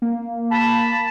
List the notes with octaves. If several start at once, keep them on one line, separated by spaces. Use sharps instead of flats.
A#3
A5 B5